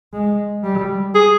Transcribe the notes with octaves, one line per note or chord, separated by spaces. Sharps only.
G#3
G3
G#4